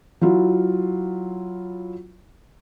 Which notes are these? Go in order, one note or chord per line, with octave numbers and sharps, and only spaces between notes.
F#3 E4 F4